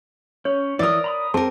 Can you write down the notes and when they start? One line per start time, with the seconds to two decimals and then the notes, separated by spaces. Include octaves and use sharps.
0.45 C#4 C#5
0.79 E3 A#4 D5 D#6
1.04 A#5 B5 D#6
1.34 C4 G#4 A#4 A5